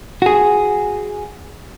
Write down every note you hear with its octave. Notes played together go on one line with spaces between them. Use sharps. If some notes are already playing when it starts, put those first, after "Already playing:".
F#4 G#4